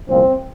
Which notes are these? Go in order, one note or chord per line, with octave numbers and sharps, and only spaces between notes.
C2 A#2 F3 C4